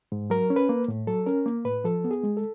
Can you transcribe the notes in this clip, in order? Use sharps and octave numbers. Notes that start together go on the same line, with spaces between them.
G#2
F#3 A#4
C#4
B4
A#3
A2
F#3 A4
C#4 A#4
A#3
A2 B4
F3 A4
B3
G#4
G#3
A4